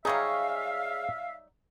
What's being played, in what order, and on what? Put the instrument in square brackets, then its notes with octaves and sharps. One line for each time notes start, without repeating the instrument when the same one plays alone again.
[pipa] F#3 G3 D#4 [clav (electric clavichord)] G#4 C#5 [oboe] E5 [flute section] F5